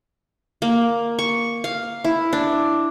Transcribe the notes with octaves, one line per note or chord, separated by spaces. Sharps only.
A#3
C#6
F5
E4
D4